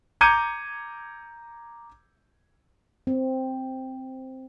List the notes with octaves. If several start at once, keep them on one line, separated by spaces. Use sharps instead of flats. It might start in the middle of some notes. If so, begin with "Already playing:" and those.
A#5 D6 G6 G#6 C#7 D#7
C4